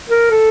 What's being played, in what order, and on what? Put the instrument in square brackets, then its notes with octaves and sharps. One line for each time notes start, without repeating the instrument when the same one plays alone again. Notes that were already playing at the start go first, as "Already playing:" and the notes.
[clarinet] A#4
A4